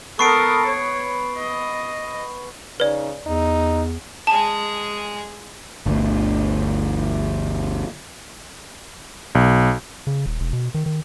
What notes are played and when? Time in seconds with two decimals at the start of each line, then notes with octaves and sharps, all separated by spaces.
0.19 B3 A4 A#4 C#6 C7 D7
0.66 C#5
1.37 D#5
2.80 C#3 D#4 B4 D5
3.27 E2 D#4
4.27 G#3 G#4 A5
5.86 G1 D2
9.35 B1
10.07 C#3
10.26 D#1
10.40 E1
10.53 B2
10.74 D#3
10.86 D#3